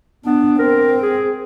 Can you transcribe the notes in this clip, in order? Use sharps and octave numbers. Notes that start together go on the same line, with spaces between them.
B3 D4
C4 A#4
G#4